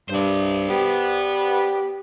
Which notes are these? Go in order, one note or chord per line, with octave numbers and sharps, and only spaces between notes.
G2 C5 D5
B3 G4